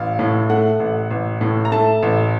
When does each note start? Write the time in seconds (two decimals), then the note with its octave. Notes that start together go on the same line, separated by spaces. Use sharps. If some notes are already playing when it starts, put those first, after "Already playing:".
Already playing: A1 F5
0.19 A2
0.50 A3 F#5
0.80 A1
1.11 A1
1.41 A2
1.65 A#5
1.72 A3 A5
2.03 A1